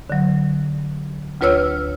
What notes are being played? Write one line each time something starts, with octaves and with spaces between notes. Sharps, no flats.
D3 F#3
D2 F4 B4 C#5 E6 F6